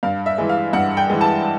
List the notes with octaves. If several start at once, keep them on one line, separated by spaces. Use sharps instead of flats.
G2 F5
E5
E3 G#3
F5
G2 F#5
G5
E3 G#3
A5